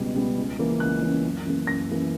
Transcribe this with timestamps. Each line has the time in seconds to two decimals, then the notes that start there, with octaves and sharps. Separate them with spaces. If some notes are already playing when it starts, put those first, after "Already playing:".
Already playing: C#2 B2 G3 B3
0.15 B2 G3 B3
0.38 C#2
0.59 C#3 E3 A#3 C#4
0.80 C#2 F#6
1.02 C#3 E3 A#3 C#4
1.24 F#2
1.45 C#3 E3 A#3
1.67 F#2 A#6
1.90 C#3 E3 A#3